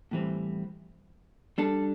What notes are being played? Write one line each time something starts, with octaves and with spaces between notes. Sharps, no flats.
A2 E3 G3 C4
G3 D4 A4